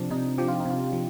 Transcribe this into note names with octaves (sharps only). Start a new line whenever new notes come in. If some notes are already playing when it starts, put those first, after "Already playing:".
Already playing: C3 F3 C4 D4
C3 D#4
F3 G4
F4
D#4
C3
F4
F3